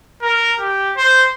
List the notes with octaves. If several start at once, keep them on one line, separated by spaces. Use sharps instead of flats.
A#4
G4
C5